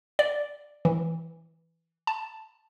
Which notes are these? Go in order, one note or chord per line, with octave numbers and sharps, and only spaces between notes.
D5
E3
A5